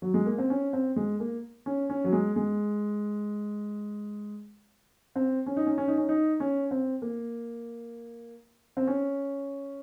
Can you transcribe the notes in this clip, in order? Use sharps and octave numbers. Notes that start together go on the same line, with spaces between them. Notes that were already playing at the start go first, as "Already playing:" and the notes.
F#3
G#3
A#3
C4
C#4
C4
G#3
A#3
C#4
C#4
F#3
G#3
G#3
C4
C#4
D#4
C#4
C#4
D#4
C#4
D#4
C#4
C4
A#3
C4
C#4